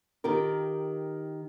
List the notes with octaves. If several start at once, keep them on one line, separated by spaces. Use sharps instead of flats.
D#3 F4 G4 A#4